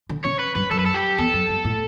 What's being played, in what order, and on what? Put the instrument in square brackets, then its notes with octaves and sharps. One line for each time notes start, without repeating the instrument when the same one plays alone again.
[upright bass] D3
[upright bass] C#3 [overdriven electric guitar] C#5
[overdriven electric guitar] B4
[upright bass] G2 [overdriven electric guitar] B4
[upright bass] F#2 [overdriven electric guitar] A4
[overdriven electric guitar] B4
A4
G4
[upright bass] E2 [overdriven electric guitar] A4
[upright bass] F#2
G2
A2